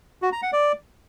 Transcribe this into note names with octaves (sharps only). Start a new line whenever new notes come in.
F#4
A#5
F#5
D5